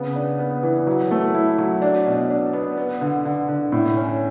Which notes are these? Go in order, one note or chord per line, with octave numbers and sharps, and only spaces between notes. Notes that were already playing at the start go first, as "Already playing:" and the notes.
Already playing: C#3 B3
D4
B3
E3
F#3
A3
E4
F#3
D4
B2
D4
B3
B3
D3
D3
D3
A2
C#4